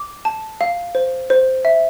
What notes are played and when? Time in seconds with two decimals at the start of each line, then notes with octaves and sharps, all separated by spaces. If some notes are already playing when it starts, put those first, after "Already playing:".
Already playing: D6
0.25 A5
0.61 F5
0.95 C5
1.30 C5
1.65 E5